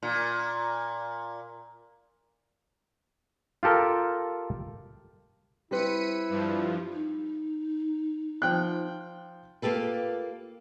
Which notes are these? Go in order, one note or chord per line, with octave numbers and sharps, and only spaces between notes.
A#2
F4 G4 A4 A#4
G3 C4 E4 B4 B6 C#7 D#7
G2 F3
D#4
F3 G5 F#6
A#3 F4 G4 A4 B4